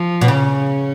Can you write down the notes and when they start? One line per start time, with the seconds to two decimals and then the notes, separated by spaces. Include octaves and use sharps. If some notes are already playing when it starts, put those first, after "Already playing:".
Already playing: F3
0.21 B2
0.28 C#3 C#4